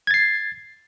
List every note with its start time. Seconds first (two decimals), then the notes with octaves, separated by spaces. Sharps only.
0.07 G#6
0.11 A6
0.14 C7